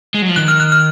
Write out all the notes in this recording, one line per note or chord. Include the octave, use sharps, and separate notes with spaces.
G#3
F#3
F3
D#3 F#6
F6
F#6
F6